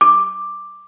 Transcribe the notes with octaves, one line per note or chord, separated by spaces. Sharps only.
D6